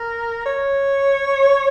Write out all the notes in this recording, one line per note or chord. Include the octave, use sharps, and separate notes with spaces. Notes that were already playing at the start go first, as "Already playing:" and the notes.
Already playing: A#4
C#5